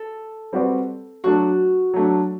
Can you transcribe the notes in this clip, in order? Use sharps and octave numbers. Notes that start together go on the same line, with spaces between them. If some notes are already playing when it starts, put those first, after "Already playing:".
Already playing: A4
G3 C4 F#4 B4 D5
F#3 A3 D4 F#4
F#3 A3 D4